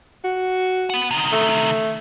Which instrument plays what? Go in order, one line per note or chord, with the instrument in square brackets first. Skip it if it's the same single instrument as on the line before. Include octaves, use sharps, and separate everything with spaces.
[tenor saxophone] F#4
[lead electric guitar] B3 F#5
C3 D#3
[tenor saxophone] A3